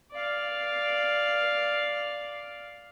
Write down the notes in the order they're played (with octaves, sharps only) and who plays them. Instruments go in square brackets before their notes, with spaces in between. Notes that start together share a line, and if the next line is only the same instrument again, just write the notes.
[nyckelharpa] D5 F5